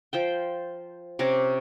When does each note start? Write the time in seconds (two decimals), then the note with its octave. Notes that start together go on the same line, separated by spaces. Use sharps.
0.13 F3 C5 G5
1.19 C3 C#4 A#5 D6